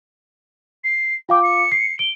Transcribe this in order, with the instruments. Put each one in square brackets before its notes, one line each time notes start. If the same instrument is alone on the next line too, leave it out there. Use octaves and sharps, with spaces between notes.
[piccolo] C7
[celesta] F4 F5 D6 [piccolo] G5
[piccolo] C#7
[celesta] C7
[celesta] D7 [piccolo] G7